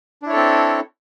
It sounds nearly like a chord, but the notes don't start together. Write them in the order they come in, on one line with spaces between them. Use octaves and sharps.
D4 E4 C#5 A4 C4